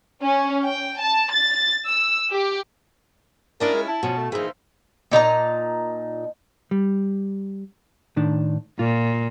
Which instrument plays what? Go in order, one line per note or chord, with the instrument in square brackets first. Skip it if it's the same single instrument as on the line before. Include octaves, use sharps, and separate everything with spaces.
[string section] C#4
G5
A5
A6
E6
G4
[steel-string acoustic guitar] C#4 E4 F4 [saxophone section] D4 D#5 [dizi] A#4
[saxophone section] G#3
[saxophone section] E4 [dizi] A5
[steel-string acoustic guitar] B2 [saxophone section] F3 C#4 F#4
[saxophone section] A3
[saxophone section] A#2 F3 E5 [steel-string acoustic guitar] E3 D#4 [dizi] G#4
[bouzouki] A#2 D#4 A5 A#5
[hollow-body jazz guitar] G3
A2 D#3 D4
[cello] A#2 [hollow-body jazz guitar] F4